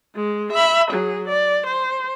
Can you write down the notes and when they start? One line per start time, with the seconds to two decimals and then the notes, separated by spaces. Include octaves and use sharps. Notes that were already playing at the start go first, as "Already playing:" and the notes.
0.16 G#3
0.53 E5 B5
0.91 F#3 G#4
1.28 D5
1.66 C5